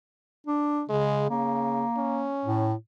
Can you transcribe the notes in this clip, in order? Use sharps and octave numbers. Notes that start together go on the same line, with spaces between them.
D4
C#3 G#3
C#3 A#3
C#4
A2